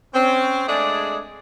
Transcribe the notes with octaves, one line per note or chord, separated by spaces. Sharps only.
C4 C#4
G#3 A3 D4 G#4 D5 G#5